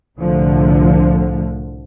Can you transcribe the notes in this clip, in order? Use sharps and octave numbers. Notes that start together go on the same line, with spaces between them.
C2 A2 D3 F3 A3